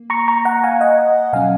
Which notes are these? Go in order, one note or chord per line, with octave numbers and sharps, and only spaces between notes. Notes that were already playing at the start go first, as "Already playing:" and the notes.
Already playing: A#3
A#5 C#6
A#5 C#6
F#5 A#5
F5 G#5
D#5 F#5
B2 F#3 C#4 F5 G#5